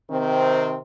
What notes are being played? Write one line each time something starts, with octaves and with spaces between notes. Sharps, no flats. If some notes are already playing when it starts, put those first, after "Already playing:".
C3 D#3 C4